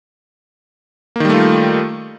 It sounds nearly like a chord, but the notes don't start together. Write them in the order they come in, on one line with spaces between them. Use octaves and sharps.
A#3 D#3 G3 A3 F4